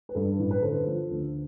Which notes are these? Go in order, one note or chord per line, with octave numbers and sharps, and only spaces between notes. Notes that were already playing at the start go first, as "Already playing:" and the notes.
B4
G2 A4
A1
B4
D3 A4 C5
F3
D2